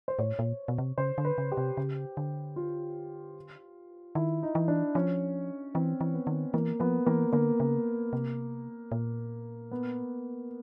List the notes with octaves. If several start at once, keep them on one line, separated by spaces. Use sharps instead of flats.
C5
A2 C#5
A#2
B2
C3
C#3 C5
D3
B4
C#3
G4
C3
C#3
D3
F4
D#3 E4
D#4
E3
D4
F3 C#4
E3 C4
E3
B3
D#3
E3 A#3
F3 B3
E3 A#3
D3 A#3
C#3
C3
A#2
B3